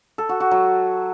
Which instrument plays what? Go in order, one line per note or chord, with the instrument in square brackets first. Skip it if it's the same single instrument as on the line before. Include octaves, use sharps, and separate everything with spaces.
[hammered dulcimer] A4
F#4
F#4
F#3